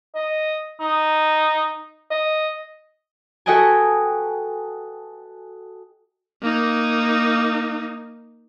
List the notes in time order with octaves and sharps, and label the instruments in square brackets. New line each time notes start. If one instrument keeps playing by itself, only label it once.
[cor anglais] D#5
D#4
D#5
[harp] F#4 A4 B4 D#5 G5 G#5
[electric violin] A#3 D#4